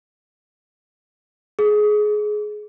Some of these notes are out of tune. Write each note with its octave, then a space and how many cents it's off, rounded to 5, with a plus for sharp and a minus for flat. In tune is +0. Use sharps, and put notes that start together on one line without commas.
G#4 +20